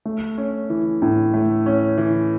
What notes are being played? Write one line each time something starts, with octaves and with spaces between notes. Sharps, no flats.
A3
C#4
E3
A2
A3
C#4
E3